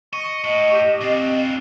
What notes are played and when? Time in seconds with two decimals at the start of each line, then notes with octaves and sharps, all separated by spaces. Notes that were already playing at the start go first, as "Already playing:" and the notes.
0.13 D#5 C#6
0.44 A2 D#5
0.72 G4
1.01 C4 D4 F4